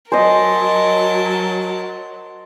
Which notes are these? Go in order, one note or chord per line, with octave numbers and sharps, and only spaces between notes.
F#3 A#4 C5 D#5 G#5 A5